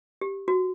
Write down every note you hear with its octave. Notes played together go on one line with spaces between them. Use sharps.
G4
F#4